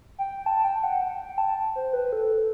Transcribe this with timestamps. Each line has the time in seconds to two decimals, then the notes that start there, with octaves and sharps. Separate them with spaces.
0.18 G5
0.46 A5
0.64 G5
0.83 F#5
1.02 G5
1.20 G5
1.38 A5
1.76 C5
1.93 B4
2.13 A4